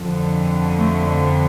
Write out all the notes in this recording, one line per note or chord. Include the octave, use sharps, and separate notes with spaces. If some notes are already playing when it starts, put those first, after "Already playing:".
Already playing: F2 D3
A3